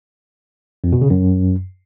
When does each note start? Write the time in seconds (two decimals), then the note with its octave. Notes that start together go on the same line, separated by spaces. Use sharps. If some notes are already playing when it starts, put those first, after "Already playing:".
0.84 F2
0.93 B2
1.01 C#3
1.10 F#2